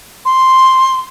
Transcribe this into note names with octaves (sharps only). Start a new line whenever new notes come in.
C6